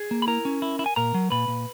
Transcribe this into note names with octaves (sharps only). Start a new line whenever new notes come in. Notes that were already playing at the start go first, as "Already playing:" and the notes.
Already playing: G#4
A#3
B5
E4 A#4 A#5
C#4
E4
E4
G#5
A#2 A#4 A#5
F#3
A#2 B4 B5
A#2